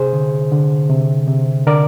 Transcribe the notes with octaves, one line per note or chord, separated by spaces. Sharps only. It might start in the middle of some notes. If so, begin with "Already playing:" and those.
Already playing: C3 G#4 C5
D3
D3
C3
C3
D3 A#4 D5